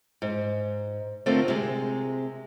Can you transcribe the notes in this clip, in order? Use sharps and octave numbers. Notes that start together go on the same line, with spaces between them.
G#2
D3 A3 C4 F4 A#4
C3 G#3